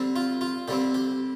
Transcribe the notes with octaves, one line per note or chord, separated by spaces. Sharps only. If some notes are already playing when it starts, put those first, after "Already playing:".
Already playing: D3 G3 C4
F4
F4
D3 G3 C4 G4
G4